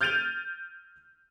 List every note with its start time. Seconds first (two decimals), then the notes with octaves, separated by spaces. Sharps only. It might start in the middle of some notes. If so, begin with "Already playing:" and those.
0.01 F6 G6 A6 D7 D#7 F7